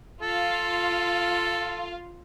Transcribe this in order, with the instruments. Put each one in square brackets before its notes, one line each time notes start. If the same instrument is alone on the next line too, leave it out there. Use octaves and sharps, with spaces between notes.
[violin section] F4 F5 [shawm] A4